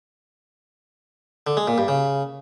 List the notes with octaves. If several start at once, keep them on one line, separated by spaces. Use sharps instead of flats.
D3
G#3
A#2
G2
C#3